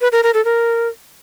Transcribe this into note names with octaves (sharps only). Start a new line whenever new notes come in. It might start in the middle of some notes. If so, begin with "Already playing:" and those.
B4
A#4
A#4
A4
A#4